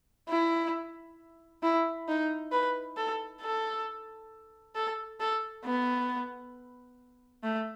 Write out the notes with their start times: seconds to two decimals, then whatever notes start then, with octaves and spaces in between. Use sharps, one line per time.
0.29 E4
1.63 E4
2.08 D#4
2.52 B4
2.97 A4
3.41 A4
4.75 A4
5.20 A4
5.65 B3
7.44 A3